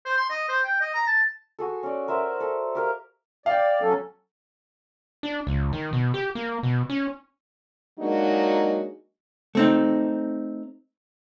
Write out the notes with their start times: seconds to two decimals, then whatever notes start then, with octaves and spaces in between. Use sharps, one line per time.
0.05 C5
0.17 C6
0.30 D#5
0.49 C5
0.64 G5
0.81 D#5
0.94 A#5
1.07 A5
1.59 F#4 G#4 A4
1.83 C#4 D5
2.08 A#4 C5 E5 F#5
2.40 A4
2.75 G4 A#4 F5
3.46 D5 F5 G5
3.82 F#3 C#4 A4
5.23 D4
5.47 C#2
5.73 D#3
5.93 B2
6.14 G4
6.35 A#3
6.63 B2
6.90 C#4
8.00 F#3 G#3 A#3 D4 D#4 F#4
9.55 A3 C4 D#4